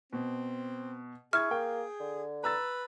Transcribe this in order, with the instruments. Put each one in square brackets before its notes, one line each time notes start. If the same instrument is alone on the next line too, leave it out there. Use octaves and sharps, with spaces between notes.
[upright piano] B2 [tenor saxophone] C4
[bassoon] E4 [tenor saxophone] G#4 [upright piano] C#6 G#6 [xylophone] F6
[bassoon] A#3 [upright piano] G5
[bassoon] D3
[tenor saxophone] B4 [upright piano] A#5 E6 A6